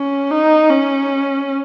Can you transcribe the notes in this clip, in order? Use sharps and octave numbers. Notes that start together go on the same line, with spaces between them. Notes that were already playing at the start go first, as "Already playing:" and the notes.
Already playing: C#4
D#4
C#4